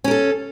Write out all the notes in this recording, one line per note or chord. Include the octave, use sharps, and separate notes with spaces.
C#4 A4 A#4